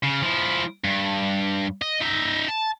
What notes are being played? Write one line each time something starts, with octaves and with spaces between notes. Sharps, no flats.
C#3
F3 E4
G2
D#5
D#4 E5
A5